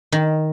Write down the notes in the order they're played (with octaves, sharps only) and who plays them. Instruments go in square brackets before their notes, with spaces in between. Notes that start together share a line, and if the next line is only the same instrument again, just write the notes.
[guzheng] D#3